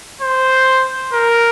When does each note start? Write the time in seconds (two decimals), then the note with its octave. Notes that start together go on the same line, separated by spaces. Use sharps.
0.22 C5
1.13 A#4